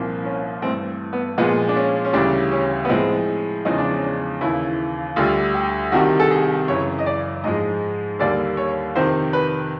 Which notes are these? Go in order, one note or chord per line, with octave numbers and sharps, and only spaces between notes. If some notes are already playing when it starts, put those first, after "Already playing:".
Already playing: C2 A#2 F3 A#3
C#4
G2 E3 A3 C4
B3
A#2 F3 G#3 B3
D4
C#4
C#4
D2 C#3 E3 G3 D4
C#4
B3
A2 F3 G#3 C4
E2 C#3 F3 G#3 D#4
D4
C#4
D4
D#2 C#3 E3 E4
D2 D3 G3 F4
G4
C2 C3 D#3 G3 F#4
A4
G#4
F#2 C#3 E3 C#5
D#5
D5
G#2 F3 G#3 D#5
D#2 D3 G3 A#3 D5
C#5
F2 C3 D#3 C5
B4